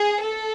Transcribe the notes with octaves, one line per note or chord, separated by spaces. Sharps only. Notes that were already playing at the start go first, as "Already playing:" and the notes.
Already playing: G#4
A4